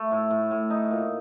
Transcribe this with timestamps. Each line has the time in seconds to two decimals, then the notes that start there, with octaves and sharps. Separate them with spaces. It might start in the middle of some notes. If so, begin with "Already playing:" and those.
Already playing: A3
0.11 A2
0.30 A2
0.51 A2
0.70 D#4
0.91 A#2